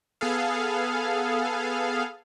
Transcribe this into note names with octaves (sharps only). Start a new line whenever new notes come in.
B3 G#4 A4 F5